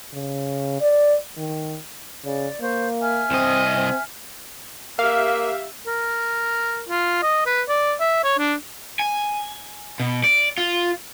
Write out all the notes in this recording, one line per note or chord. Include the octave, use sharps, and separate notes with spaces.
C#3
D5
D#3
C#3 D5
A#3 C5 C#6
E5 G#5 F6
C2 C4 D#5
C4
A#3 G4 E5 F5
A#4
F4
D#5
B4
D5
E5
C#5
D4
G#5
B2
D5
F4